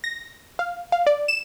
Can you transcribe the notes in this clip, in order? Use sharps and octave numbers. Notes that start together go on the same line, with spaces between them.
A#6
F5
F5
D5
E7